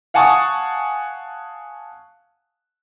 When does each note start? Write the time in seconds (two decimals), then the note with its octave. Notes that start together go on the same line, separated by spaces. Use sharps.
0.14 F5 F#5 G#5 A5 C#6 D#6